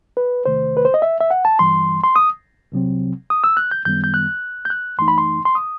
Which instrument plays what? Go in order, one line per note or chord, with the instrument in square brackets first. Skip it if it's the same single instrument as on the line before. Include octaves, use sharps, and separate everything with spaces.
[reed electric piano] B4
E2 C3 D#3 A3 C5
B4
C5
D#5
E5
E5
F#5
A5
G2 E3 G3 C6
C6
D#6
C2 C3 F#3 C4
D#6
E6
F#6
G6
F#2 D#3 G3 B3 G6
G6
F#6
G6
F#6
F#2 E3 A3 D#4 C6
B5
C6
C6
D#6